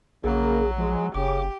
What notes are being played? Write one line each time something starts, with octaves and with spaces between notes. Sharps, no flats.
A#1 C#3 F#3 A#3 G#4
F3 G#3
F#1 C#3 G4 D6